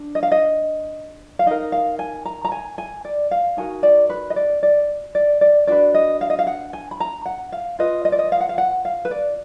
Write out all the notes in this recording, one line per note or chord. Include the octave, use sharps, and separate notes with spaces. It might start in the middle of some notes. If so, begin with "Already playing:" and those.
Already playing: D4
D#5
F5
D#5
F5
D#4 A#4 D#5
F5
G#5
A#5
A#5
G#5
G#5
D5
F5
D#4 F#4 A#4 G#5
D5
B4
D#5
D5
D5
D5
D5
D4 F#4 B4 D5
D#5
F5
D#5
F5
F#5
G#5
B5
A#5
F#5
F5
F4 B4 D#5
D#5
D5
D#5
F5
F#5
F5
F#5
F5
B4
D5